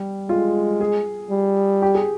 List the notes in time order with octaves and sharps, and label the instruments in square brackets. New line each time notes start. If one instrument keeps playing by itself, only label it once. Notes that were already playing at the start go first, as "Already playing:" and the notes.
Already playing: [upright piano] G3
[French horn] G#3 [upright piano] F4
[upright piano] G#4
[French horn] G3
[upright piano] G4
G#4